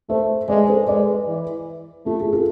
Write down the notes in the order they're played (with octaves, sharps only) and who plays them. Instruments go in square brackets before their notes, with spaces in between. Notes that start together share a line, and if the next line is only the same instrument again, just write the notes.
[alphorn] A3 [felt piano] C5 E5
[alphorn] G#3 [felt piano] B4 D5
[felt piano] A4 C5
[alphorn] G#3 [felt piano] B4 D5
[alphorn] E3
[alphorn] A3 [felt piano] F4
[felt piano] G#4
F4 A4